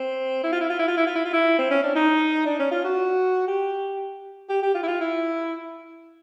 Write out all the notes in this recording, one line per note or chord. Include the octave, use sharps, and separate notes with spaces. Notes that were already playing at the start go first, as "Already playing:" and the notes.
Already playing: C4
E4
F4
E4
F4
E4
F4
E4
F4
E4
F4
E4
C4
C#4
D4
D#4
D4
C#4
F4
F#4
G4
G4
G4
F4
E4
F4
E4